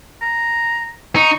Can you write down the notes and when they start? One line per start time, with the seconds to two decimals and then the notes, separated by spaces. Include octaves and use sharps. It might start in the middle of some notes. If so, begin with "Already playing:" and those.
0.22 A#5
1.16 D#4 C#6